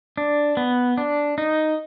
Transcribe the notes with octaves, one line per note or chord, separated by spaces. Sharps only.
D4
B3
D4
D#4